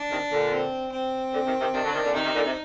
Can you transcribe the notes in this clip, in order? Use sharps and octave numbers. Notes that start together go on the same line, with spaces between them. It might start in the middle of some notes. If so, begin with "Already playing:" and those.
Already playing: D4
C3 D#3
A#2 D3
C4
C4
A#2 D3
C3 D#3
C3 D#3
C3 D#3 D4
D3 F#3
C3 D#3
A#2 D3
C3 D#3 D#4
C3 D#3
A#2 D3
C3